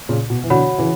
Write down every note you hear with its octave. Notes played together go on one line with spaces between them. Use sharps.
A#2 C#3
B2
E3
B2 D3 F#4 C#5 F#5 B5
C#3 E3